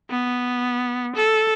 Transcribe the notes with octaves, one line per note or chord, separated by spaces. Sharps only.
B3
A4